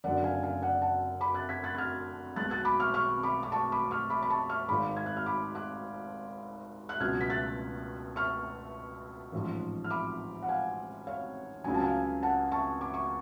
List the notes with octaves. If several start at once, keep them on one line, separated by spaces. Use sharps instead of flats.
F#1 F#2 D3 D5 F#5
F5 G#5
F5 G#5
D5 F#5
F#5 A5
B5 D6
F#6 A6
G#6 B6
F#6 A6
A6
F6 G#6
B1 B2 G#3 F#6 A6
F#6 A6
B5 D6
C#6 F6
C#6 F6
B5 D6
D6
A5 C#6
B5 D6
C#6 F6
B5 D6
B5
A5 C#6
C#6 F6
G#1 G#2 G#3 B5 D6
G#6
F#6
F6
B5 D6
D6 F#6
F#6
C#2 B2 F#3 F6 G#6
B6
F#6 A6
C#6 F6
A1 G#2 F3
F6
B5 D6
F#5
F5 G#5
C#5 F5
C#2 C#3 F#3 G#5
A5
F5 G#5
F#5 A5
A5 C#6
D6
C#6